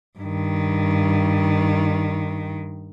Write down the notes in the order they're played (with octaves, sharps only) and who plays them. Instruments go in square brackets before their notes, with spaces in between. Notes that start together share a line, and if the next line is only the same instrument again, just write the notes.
[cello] G2 D#3